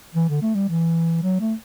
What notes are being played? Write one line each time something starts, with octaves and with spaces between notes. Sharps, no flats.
E3
D3
A3
G3
E3
F#3
A3